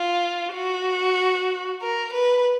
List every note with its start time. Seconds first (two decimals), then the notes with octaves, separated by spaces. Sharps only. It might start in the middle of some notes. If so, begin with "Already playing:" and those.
Already playing: F4
0.53 F#4
1.81 A#4
2.13 B4